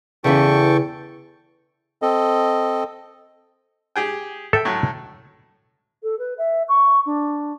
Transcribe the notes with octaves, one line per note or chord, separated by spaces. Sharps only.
E2 C#3 E3 A4 G5 C#6
C4 A4 D#5
G4 G#4 G5
A4 E5 G5
A2 F#3
A4
B4
E5
C#6
D4